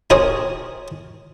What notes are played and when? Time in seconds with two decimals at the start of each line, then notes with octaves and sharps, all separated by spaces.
0.10 D#4 G4 G#4 A#4 C5 C#5